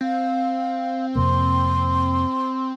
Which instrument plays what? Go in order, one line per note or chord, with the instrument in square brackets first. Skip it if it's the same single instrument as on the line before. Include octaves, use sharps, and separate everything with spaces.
[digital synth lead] C4 [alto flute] F5
[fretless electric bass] F2 C3 A#3 [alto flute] C6